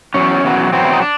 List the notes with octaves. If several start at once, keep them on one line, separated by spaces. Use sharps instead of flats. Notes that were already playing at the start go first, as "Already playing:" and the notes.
E2 B2 F#3 C#4
E2 B2 F#3
E2 B2 F#3 C4
E4
D#4
D4